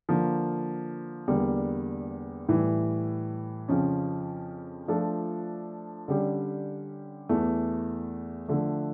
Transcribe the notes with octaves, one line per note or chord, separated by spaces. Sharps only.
D3 F3 A#3
E2 D3 G3 A#3
A2 E3 G3
F2 C#3 F3 C#4
F3 A3 D4 F4 A4
D3 G3 C#4 G4
E2 E3 A3
D3 F3 A3